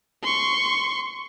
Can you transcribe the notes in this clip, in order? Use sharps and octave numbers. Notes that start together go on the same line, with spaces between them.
C6 C#6